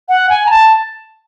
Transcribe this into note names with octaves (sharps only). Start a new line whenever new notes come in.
F#5
G#5
A#5
A5